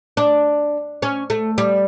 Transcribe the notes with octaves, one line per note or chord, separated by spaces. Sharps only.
D4
C#4
A3
G3